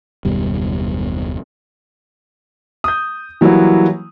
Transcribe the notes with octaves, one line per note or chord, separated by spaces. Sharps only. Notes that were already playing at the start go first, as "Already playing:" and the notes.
F#1 D#2 B2 G3
D#6 G6
E3 F#3 G3 A#3 E4 F#4